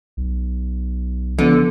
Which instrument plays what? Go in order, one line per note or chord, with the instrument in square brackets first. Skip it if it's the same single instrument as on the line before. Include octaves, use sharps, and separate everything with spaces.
[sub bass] B1
[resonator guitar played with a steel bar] D3 [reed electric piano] F3 B3